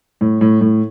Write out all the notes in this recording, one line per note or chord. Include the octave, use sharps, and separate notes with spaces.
A2
A2
A2